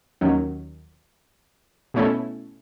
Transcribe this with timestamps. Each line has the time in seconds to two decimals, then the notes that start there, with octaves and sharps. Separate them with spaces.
0.21 D#2 D#3 F#3 C#4
1.94 B2 A3 C#4 E4 A4